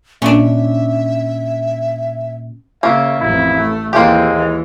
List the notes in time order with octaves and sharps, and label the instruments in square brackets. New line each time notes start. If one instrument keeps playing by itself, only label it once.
[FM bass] A#2 [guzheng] C#4 D4 [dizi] E5
[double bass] C#3 [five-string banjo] A#3 C#4 [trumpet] E5
[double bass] A1 F2 [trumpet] E4
[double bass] A3
[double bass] D#2 E3 [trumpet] G#3 [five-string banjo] A#3 C4 G4
[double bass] D#2 E3